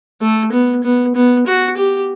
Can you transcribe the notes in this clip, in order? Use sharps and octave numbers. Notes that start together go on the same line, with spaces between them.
A3
B3
B3
B3
F#4
G4